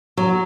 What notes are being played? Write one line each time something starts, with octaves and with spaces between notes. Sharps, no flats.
F#3